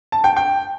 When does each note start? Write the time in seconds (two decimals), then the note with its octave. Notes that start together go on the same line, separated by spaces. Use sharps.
0.12 A5
0.24 G5
0.36 G5